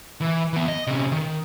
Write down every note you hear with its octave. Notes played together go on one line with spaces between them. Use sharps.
E3
E3 B3
D#5
C3 C#4
D#3